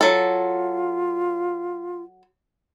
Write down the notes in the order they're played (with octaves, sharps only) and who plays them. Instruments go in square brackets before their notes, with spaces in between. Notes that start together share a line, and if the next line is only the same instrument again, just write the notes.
[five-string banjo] F#3 A4 [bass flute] F4